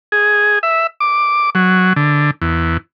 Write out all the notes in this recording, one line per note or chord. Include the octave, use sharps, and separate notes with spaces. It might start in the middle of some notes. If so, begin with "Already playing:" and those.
G#4
E5
D6
F#3
D3
E2